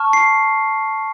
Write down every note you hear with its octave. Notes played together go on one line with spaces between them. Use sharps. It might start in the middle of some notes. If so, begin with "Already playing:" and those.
Already playing: A5 C#6 F6
C7